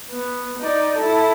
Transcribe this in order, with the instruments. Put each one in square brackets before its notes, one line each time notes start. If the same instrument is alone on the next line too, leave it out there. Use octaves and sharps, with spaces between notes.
[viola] B3
D#4 D5
E4 A4